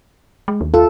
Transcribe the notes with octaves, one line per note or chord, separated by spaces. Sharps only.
G#3
D#2
F4 A4